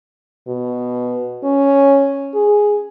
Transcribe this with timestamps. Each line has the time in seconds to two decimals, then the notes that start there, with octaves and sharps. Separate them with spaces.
0.47 B2
1.43 C#4
2.34 G#4